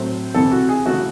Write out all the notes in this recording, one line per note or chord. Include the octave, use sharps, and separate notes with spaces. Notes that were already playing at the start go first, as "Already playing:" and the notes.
Already playing: A2 F#3 A3 C4 C5
C3 E3 C4 A4
F#4
G#4
C#3 E3 A3 F#4